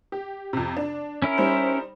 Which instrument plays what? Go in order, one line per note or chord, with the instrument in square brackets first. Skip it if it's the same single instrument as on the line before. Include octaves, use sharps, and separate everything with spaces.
[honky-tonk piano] G4
F2 C3
D4
[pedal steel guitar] C#4 E4 A#4
[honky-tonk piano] G3 D#4 C5